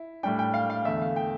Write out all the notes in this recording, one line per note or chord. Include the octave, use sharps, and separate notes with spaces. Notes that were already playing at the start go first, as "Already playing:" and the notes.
Already playing: E4
A2 G3 D4 G5
G5
F5
F5
E2 D3 A3 E5
F5
G5